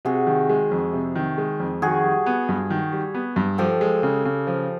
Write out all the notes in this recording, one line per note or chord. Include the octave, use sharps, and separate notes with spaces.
C3 F#4 G#4
D#3
G#3
F2
C3
D#3
G#3
F2
D#3 F#4 G#4
G3
B3
G2
D#3
G3
B3
G2
F3 G4 A4
G#3
C#3
C#3
F3